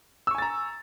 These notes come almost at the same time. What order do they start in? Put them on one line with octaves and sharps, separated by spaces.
E6 C#6 G#5 A6 A#5